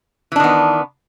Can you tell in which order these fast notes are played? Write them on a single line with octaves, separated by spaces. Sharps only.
E3 D4 D#3 B3